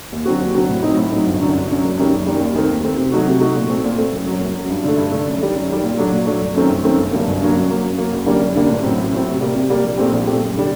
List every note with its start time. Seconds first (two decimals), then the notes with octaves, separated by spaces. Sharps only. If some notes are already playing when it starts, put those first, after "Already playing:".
0.12 D#2
0.25 D3 F#3 C4 F#4
0.40 D#2
0.55 D3 F#3 C4 F#4
0.69 A2
0.83 F#3 C4 D#4
0.97 A2
1.12 F#3 C4 D#4
1.27 G1
1.40 F#2 D3 F#3
1.55 G1
1.70 F#2 D3 F#3
1.84 F#1
1.98 F#2 D#3 G3
2.12 F#1
2.27 F#2 D#3 G3
2.40 D#2
2.55 D#3 A3 C4
2.70 D#2
2.83 D#3 A3 C4
2.97 C3
3.12 F#3 A3 D#4 F#4
3.26 C3
3.40 F#3 A3 D#4 F#4
3.55 A#2
3.70 A3 C4
3.84 A#2
3.98 A3 C4
4.13 F#1
4.26 F#2 F#3
4.40 F#1
4.55 F#2 F#3
4.70 G2
4.84 D3 A3
4.98 G2
5.12 D3 A3
5.27 F#2
5.41 D#3 G3
5.55 F#2
5.69 D#3 G3
5.83 A#2
5.97 F#3 A3 D4
6.12 A#2
6.26 F#3 A3 D4
6.41 G1
6.55 F#2 D#3 A3 C4
6.70 G1
6.83 F#2 D#3 A3 C4
6.98 G1
7.12 G2 D3 F#3 A#3
7.27 G1
7.40 G2 D3 F#3 A#3
7.55 F#2
7.70 F#3 A#3
7.83 F#2
7.98 F#3 A#3
8.13 F#1
8.26 F#2 D3 G3 A#3
8.41 F#1
8.55 F#2 D3 G3 A#3
8.70 A1
8.83 A2 F#3 C4
8.97 A1
9.12 A2 F#3 C4
9.26 C3
9.41 G3 A#3
9.55 C3
9.70 G3 A#3
9.84 A#1
9.98 A#2 A3 C4 G4
10.12 A#1
10.27 A#2 A3 C4 G4
10.41 F#1
10.57 D3 G3